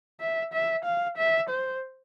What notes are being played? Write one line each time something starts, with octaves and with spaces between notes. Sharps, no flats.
E5
E5
F5
E5
C5